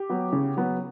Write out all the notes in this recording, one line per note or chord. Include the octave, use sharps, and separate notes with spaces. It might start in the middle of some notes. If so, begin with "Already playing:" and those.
Already playing: G4
F#3 B3
C#3
F#3 B3